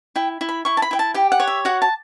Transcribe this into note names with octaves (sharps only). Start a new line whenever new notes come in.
E4 G5
E4
B5
E4 C#6
A5
B5
E4 G5
A5
G4 G5
F#5
C#5
E5
F#4 F#5
A5